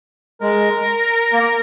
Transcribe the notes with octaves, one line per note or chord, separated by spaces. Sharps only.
G#3 A#4
A#3